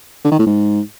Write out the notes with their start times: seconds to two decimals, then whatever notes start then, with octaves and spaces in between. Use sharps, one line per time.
0.24 D3
0.32 D#3
0.39 A2
0.46 G#2